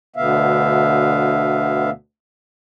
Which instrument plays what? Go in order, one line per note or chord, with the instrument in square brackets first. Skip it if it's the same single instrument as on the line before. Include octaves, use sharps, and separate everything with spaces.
[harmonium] D2 B2 D3 B3 E5 F5